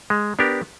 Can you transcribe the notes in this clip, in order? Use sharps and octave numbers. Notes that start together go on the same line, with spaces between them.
G#3
B3 D4 G4 A#4